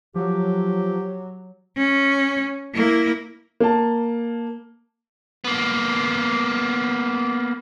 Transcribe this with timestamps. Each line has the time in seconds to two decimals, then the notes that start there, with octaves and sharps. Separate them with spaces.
0.16 F3 F#3 G4
1.76 C#4
2.74 A#3 E4
3.60 A#3 A5
5.44 A#3 B3